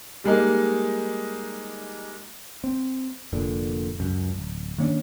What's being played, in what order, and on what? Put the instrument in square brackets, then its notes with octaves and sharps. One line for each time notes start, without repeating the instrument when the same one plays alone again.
[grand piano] G3 G#3 A#3 D#4
[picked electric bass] C4
F1 A#2 D3
C#2 F#2
D1
D#3 A#3 C#4 D4